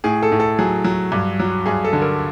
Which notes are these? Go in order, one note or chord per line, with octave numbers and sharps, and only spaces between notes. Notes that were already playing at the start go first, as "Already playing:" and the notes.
A2 G#4
A4
A2
A4
F#3 G#4
F#3
G2
F#3
G2 G#4
A4
D3
A#4